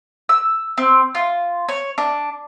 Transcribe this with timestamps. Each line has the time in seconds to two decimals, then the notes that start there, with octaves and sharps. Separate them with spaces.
0.29 E6
0.78 C4
1.15 F4
1.69 C#5
1.98 D4